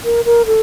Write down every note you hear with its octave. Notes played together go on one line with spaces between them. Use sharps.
A#4
A#4
A4